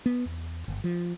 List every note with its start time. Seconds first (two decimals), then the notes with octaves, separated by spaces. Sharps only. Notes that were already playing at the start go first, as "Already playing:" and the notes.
0.06 B3
0.26 E2
0.68 G1
0.84 F3